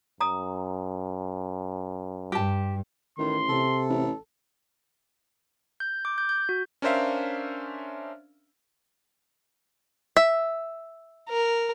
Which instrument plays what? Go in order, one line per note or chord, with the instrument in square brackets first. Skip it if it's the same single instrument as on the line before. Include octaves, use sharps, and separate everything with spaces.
[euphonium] F#2 [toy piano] A#5 D#6
[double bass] G2 [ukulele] G4 A5
[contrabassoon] A1 [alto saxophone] D#3 [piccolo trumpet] C6
[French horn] C3 [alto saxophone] A4
[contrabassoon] A1
[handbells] G6
D6
G6
G6
F#4
[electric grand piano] C#4 D4 A#4 C5 E5 F5
[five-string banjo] E5
[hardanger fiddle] A#4